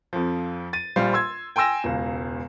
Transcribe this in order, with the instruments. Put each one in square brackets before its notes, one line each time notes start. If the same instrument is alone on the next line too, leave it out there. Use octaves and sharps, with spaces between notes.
[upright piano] F2 F3
A6 D#7
A#1 G3 C5 F5
C6 E6 G#6
G5 G#5 C6 E6 A#6 E7
E1 C#2